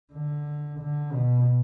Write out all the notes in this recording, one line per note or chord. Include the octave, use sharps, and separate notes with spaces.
D3
D3
B2